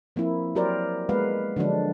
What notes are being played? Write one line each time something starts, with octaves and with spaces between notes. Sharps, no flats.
F3 A#3 C4 E4 F4
F#3 G4 A#4 C5 D5
G#3 A#3 B3 B4 F5
D3 F3 F#3 G#3 D4